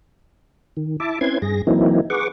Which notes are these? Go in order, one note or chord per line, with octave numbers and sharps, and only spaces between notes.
D#3
E4 E5 A5 D6
C4 C#4 E4 B4 C6 G#6
G2 G#4 A#6
E3 F#3 A#3 C4 D#4 E4
G#4 B4 F#5 C#6 D6